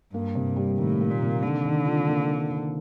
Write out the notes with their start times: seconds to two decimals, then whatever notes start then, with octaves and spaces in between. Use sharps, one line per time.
0.13 G2 A#3
0.35 C3
0.56 G3
0.78 A2 D#3
1.00 A#3
1.10 A#2
1.21 C3
1.42 D3 D#3
1.64 D#3
1.85 F4
2.07 A#3
2.28 D#3
2.49 D#3